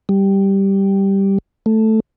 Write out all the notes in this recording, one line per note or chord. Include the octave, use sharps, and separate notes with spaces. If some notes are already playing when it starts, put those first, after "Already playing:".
G3
A3